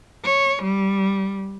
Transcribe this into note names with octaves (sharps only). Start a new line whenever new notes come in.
C#5
G3